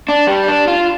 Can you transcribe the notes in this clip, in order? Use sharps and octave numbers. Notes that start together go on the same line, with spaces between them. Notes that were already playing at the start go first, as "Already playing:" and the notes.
D4
G3
D4
F4